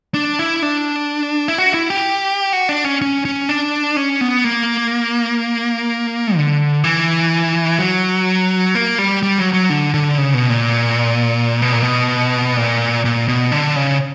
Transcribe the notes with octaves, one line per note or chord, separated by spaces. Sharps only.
D4
E4
D4
E4
F#4
E4
G4
F#4
D4
C#4
C#4
C#4
D4
C#4
B3
A#3
D3
E3
F#3
A#3
G3
G3
F#3
F#3
D3
D3
C#3
B2
A#2
B2
A#2
B2
A#2
A#2
B2
D3
C#3